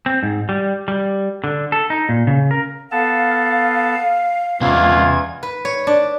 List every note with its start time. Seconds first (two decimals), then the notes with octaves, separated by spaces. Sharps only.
0.06 C4
0.23 G#2
0.49 G3
0.88 G3
1.44 D3
1.72 A4
1.90 D#4
2.09 A#2
2.27 C#3
2.51 A#4
2.92 B3 A4 F5 A5
4.61 E2 C3 E3 G#3 C#4 F4 G#6
5.43 B4
5.65 C#5
5.87 D4